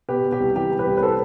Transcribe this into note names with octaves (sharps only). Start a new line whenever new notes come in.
B2 G4 B4
B2
G4
C2
E3 G4
E3
G4 B4
C2
B4
A4 C5